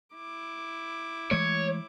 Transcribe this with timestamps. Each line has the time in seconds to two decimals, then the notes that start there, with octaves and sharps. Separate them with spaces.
0.14 E4 D6
1.31 E3 G#3 A3 C#5